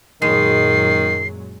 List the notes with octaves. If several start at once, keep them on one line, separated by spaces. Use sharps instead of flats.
F#2 A#2 D#3 F#3 G#3 C7